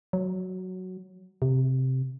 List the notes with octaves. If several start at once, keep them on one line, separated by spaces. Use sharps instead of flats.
F#3
C3